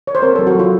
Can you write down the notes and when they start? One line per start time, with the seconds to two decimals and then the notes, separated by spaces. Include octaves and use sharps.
0.07 C#5
0.15 C5
0.22 C4 A#4
0.35 F#3 A4
0.47 F#4
0.55 F#3 F4